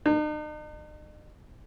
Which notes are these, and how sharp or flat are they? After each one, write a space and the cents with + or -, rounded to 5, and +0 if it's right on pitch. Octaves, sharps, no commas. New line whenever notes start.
D#4 -45